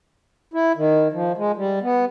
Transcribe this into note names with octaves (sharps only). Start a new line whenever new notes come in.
E4
D#3
F3
G#3
G3
B3